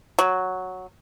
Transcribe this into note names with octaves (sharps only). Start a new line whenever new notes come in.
F#3